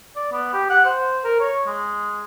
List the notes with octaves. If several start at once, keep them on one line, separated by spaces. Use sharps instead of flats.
D5
B3
G4
F#5
C5
A#4
C#5
G#3